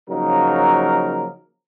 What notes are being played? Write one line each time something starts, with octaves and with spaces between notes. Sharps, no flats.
C#3 F3 F#3 A#3 D#4 A#4